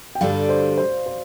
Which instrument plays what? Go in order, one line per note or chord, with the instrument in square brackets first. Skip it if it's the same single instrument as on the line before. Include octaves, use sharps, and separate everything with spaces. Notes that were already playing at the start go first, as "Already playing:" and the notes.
[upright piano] G5
[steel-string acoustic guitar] G2 D3 G3 D4 A4 [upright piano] D5 F5
[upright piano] C5
C5
C5